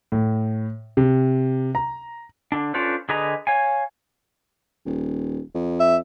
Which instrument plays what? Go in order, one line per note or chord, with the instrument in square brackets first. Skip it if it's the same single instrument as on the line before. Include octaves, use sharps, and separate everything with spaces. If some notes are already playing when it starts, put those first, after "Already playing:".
[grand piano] A2
C3
A#5
[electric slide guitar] D3 D4
C#4 D4 F4 A4 B4 C5
D3 G#4 B4 D#5 A#5
C#5 F5 G#5
[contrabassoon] D#1
F2
[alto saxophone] E5